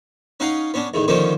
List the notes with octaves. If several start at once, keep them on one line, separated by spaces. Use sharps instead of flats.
C#4 D#4 F5 F#5 A#5
B3 C#4 D4
E2 A2 D#3
D3 D#3 F3 A#3 C#4 D#4